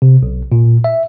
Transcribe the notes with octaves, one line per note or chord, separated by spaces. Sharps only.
C3
B1
A#2
E5